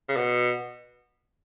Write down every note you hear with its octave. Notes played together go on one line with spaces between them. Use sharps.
C#3
B2